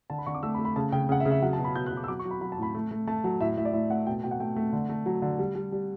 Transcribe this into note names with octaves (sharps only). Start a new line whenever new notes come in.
D3 A5
B5
D3 C#6
D6
A3 E6
B5
A3
B5
C#3 A5
C#3 G5
C#3 F#5
E5
C#3
E5
F#3 F#5
A5
B2
B5
B2 G6
F#6
B2
D6
E6
F#3 D6
C#6
F#3
B5
F#3 B5
A5
A2 B5
A3
A3
A3 A5
F#3
A2 E5
A2 E5
D5
A2 E5
A3 F#5
B2 G5
B2 G5
F#5
A3 G5
A3
D3
A3
F#3
D3
G3
G3
G3